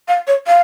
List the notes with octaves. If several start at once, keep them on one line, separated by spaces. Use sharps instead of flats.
F5
C#5
F5